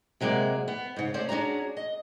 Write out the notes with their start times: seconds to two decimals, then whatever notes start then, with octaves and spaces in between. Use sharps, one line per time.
0.21 C3 F#3 G#3 A#3 D5
0.68 B3
0.96 G#2 C#3
1.14 A3 C#4 C5 D5
1.29 C#4 D4 F#4 G#4 A#5
1.77 D#5